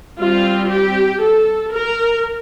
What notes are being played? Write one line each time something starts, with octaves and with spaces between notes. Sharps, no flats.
G3 C4 F4
G4
A4
A#4